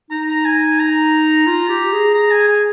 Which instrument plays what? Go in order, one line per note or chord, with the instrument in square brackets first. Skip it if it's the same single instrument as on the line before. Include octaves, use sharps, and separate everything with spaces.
[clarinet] D#4 [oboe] A#5
[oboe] A#5
G#5
A#5
[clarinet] F4
G4
G#4
[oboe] A#5
G#5
G#5